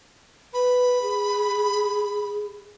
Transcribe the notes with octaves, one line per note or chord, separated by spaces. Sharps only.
B4 B5
G#4